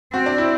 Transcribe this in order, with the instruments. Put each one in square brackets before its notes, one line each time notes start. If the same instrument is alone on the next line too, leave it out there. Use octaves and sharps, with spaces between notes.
[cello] C4 [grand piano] F#4
[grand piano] D4
E4